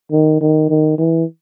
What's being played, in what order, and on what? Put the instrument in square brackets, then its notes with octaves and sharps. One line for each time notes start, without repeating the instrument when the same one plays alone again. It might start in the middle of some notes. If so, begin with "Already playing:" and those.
[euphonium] D#3
D#3
D#3
E3